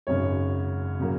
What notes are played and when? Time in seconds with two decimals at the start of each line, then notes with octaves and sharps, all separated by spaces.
0.07 G#1 F#2 C#3 C#5
1.00 C#3 F#3 A#3